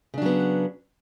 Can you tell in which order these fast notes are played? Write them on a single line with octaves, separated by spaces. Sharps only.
C#3 D4 F#3 B3